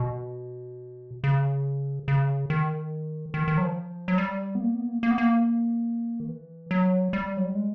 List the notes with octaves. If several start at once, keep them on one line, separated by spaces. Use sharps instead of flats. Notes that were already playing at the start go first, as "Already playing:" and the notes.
Already playing: B2
C#3
C#3
D#3
D#3
D#3
F#3
F3
F#3
G3
B3
A#3
B3
A#3
A#3
B3
A#3
D#3
E3
F#3
G3
F#3
G3
G#3